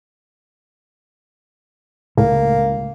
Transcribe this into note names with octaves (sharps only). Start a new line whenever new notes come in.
C#2 A2 A#3